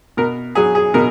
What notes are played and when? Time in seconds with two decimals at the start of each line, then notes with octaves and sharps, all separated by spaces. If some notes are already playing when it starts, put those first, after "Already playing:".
0.17 B2 A#4
0.55 F#3 G#4
0.75 G#4
0.94 B2 A#4